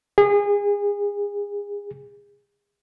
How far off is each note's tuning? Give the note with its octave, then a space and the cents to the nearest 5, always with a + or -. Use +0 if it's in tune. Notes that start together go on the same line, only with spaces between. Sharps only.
G#4 -30